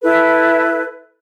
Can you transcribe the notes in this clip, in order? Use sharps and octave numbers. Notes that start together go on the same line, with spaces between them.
E4 A4 B4